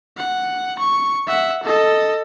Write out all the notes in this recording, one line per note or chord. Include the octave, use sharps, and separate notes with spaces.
F#5
C#6
E5 F#5
A4 D#5